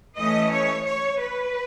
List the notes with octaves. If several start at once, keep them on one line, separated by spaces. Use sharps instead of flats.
E3 A3 C#4 D#5
C#5
C#5
B4